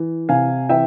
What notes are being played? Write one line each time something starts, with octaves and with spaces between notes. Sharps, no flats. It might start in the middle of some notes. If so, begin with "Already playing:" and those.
Already playing: E3
C3 F5 G#5
E3 E5 G5